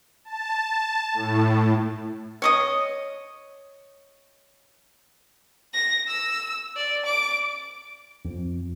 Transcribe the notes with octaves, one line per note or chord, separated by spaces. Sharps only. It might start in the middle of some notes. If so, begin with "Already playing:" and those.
A5
A2
C#5 D#5 D#6
A#6
E6
D5
D6
F2